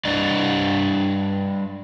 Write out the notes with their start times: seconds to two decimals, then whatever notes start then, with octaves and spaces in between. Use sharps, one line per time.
0.05 G3 D4 D5 D#5